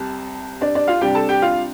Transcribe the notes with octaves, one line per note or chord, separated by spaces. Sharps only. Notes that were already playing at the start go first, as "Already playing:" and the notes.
Already playing: C2 C3 A5
D4 D5
D4 D5
F4 F5
C3 G3 D4 G4 G5
A4 A5
G4 G5
F4 F5